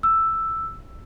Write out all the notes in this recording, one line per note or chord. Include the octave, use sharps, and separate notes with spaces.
E6